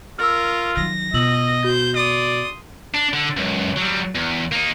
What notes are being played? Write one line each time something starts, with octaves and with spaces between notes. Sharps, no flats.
F4 A#4 E6 F6
D#3 F#3 A#6
B2 F4 D#5 E6 F#7
F#4 C5 G6
D5 C6 D#6
D4
D3
C#2 F#2
F#3 G3
E2
A#3 D#4